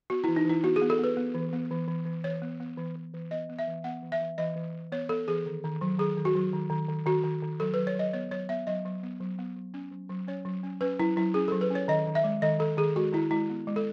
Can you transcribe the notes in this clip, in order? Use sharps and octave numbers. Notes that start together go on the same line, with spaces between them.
B3 F#4
E3 E4
D#4
E3 E4
B3 F#4
G#4
B3
A4
B3 B4
B3
E3
B3
E3
E3
E3
E3 C#5
B3
B3
E3
E3
E3
B3 D#5
B3
E5
E3
B3 F#5
E3
E5
E3
E3 D#5
E3
E3
B3 C#5
B3 A4
E3 G#4
D#3
D#3
F#3
D#3 G#4
D#3
F#4
F#3
D#3
D#3
D#3
D#3 F#4
D#3
D#3
F#3 A4
F#3 B4
C#5
F#3 D#5
B3 C#5
F#3 C#5
B3 E5
F#3 D#5
F#3
B3
F#3
B3
F#3
C#4
F#3
F#3
C#4 C#5
F#3
C#4
C#4 B4
F#3 E4
F#3 E4
C#4 G#4
F#3 A4
B4
C#4 C#5
D#3 D#5
D#3
E5
G#3
D#3 D#5
D#3 A4
D#3 G#4
G#3 F#4
D#3 E4
G#3 E4
B3
G#3
A4